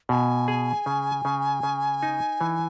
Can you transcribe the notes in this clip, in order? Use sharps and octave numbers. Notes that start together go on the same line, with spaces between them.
B2 G#5
G#4
C#3
C#3
C#3
D#4
E3